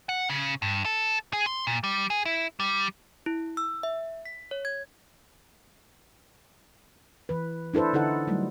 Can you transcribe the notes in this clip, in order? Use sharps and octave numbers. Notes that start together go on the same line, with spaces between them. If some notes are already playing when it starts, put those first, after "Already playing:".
F#5
C#3
G2
A4
G#4
C6
A#2
G3
G#4
E4
G3
E4
E6
E5
B6
C#5
G#6
E3 B4
D4 E4 A4 B4 C5
D3 D#4 E4 A4 F#5
F#3 G3 A3 E4